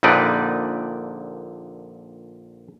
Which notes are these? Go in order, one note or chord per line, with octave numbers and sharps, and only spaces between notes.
A#1 A#2 D3 D#4 B4 D5